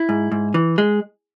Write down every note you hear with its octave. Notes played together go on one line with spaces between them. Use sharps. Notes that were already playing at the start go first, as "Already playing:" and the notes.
Already playing: E4
G#2
G#2
E3
G#3